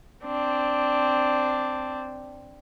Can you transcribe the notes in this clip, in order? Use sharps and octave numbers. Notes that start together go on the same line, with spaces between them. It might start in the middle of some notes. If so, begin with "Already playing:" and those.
C4 D4